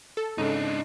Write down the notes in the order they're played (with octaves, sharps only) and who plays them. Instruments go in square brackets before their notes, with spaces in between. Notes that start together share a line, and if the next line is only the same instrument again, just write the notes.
[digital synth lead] A4
[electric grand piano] G#2 C#3 [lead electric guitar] D4 D#4